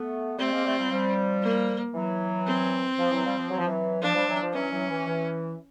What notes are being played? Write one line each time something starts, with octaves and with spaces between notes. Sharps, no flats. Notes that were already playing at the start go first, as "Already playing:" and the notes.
Already playing: A3 B3
G3 A3 C4
G#3 A#3
G3 A3
F3 G3
F3 G3
A#3
E3 F#3
C4
F3
E3 F#3
F3 G3
F3
F#3
F3
E3 F#3
F3 D4
F3 G3
E3 F#3
F3
E3 F#3 C#4
E3 F#3
E3
E3